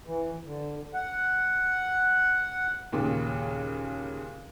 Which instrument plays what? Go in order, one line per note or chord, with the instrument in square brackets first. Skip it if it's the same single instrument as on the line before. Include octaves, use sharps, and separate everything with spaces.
[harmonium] E3
D3
F#5
[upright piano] D#2 A#2 C#3